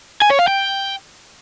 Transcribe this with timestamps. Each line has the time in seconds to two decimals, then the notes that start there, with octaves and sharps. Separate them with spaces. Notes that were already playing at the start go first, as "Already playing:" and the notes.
0.22 G#5
0.30 C#5
0.39 F5
0.47 G5